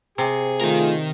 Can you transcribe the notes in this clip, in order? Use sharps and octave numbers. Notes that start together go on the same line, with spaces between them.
C3 G#4
D#3 A3 F4 A#4